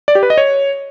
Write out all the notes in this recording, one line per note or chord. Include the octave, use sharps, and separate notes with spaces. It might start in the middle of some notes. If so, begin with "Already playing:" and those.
D5
G4
B4
D#5
C#5